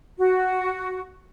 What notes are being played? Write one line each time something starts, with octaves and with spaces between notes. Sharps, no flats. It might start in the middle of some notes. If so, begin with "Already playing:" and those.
F#4